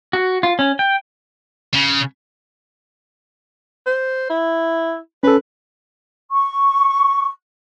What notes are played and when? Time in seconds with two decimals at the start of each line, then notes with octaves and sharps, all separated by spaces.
0.13 F#4
0.43 F4
0.59 C#4
0.79 G5
1.74 C#3
3.86 C5
4.30 E4
5.23 C#4 A4 B4
6.31 C#6